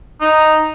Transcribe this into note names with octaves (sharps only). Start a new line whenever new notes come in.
D#4